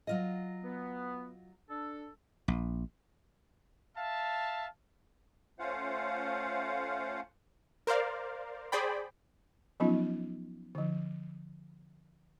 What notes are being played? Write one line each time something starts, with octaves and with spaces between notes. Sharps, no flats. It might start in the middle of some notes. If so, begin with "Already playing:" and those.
F#3 F4 D#5
B3
D4 A4
A#1
E5 F5 A5
A3 C#4 F4 C5 F5 F#5
A#4 C5 D5 F5
G#4 C5 D5 G5 B5
F3 F#3 B3 C#4 D#4 F4
D3 F3